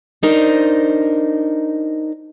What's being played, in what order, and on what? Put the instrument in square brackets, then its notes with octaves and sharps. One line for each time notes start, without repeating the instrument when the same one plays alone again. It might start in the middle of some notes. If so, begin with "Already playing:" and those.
[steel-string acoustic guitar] D4 D#4 A#4 C5